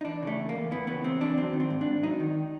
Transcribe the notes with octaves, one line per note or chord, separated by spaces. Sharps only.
D#4
E3 D4
C#3 A3
E2
A#3
E2
E3 B3
C#3 B3
E2 C4
E2 D4
F#3 C4
D#3
C4
G#2
D4
G#2
F#3 D#4
D#3